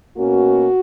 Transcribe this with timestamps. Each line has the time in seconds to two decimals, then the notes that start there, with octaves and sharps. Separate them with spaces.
0.17 B2 A#3 C#4 F#4